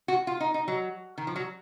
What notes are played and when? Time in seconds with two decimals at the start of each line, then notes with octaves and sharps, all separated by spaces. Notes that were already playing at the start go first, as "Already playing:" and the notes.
0.08 F#4
0.27 F4
0.40 D#4
0.54 D#4
0.68 F#3
1.18 D#3
1.27 F3
1.36 F#3